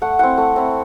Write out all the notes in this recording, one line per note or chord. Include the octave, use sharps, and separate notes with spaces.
A3 F#5
C4 E4 F#5
A3
C4 E4